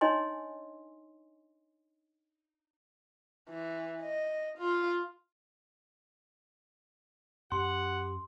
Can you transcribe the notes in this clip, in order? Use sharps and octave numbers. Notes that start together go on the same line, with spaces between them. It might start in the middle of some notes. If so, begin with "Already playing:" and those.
D4 D#4 C#5 D#5 G#5 C6
E3
D#5
F4
F#2 G4 F#5 C6